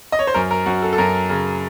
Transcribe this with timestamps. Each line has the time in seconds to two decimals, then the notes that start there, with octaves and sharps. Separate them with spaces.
0.12 D#5
0.19 C#5
0.27 C5
0.34 F#2 A#4
0.51 A#4
0.66 F#2 F#4
0.82 A4
0.93 A4
0.98 F#2 A#4
1.29 C#3